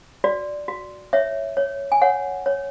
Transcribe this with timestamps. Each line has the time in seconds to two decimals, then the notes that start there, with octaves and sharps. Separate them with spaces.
0.24 F#4 D5
0.68 F#4
1.13 C#5 E5
1.57 C#5
1.92 G#5
2.02 C#5 F#5
2.46 C#5